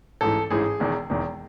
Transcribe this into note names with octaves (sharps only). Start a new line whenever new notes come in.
A1 G#2 E3 A4
A1 G#2 E3 G#4
E1 E2 D#3
E1 E2 D#3